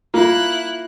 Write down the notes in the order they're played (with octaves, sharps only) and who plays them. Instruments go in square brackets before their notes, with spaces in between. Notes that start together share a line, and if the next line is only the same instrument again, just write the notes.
[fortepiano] A#3 [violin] E4 F#6 [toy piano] F4